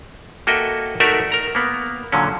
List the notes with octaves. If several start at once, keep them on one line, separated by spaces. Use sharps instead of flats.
A#3 F#4 A4 D#5 E5 G5
A3 D#4 F#4 A#4 D5 E5
A#4 A#5
A#3 B3
A#2 D3 F#3 C#4